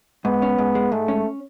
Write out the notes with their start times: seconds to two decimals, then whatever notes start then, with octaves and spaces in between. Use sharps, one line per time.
0.25 G#2 B3
0.42 C#4
0.58 G#2
0.75 G#3
0.92 G#2 A3
1.08 C#4